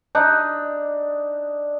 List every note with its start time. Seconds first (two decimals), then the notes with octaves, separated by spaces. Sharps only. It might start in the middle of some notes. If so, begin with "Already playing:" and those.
0.15 D4 D#4